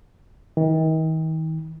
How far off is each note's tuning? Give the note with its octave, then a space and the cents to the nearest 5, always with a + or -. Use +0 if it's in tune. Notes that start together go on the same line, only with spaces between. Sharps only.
D#3 +40